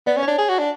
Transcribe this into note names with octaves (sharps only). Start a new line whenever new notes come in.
B3 D5
C#4
D4 C#5
G#4
F#4
D4